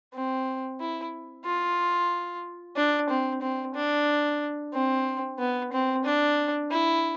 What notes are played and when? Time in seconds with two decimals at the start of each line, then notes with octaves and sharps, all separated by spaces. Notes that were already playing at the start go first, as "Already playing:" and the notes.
0.14 C4
0.80 E4
1.45 F4
2.76 D4
3.10 C4
3.42 C4
3.75 D4
4.73 C4
5.39 B3
5.73 C4
6.05 D4
6.71 E4